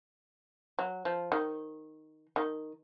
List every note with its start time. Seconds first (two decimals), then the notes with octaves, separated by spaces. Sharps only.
0.79 F#3
1.05 F3
1.32 D#3
2.36 D#3